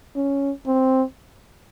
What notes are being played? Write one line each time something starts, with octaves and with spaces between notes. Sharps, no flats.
C#4
C4